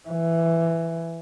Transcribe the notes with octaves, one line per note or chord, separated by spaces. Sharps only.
E3